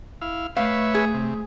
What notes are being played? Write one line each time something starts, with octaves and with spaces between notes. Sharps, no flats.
E4 F5
A3 B4 C#5 E5 F5
G#4
C3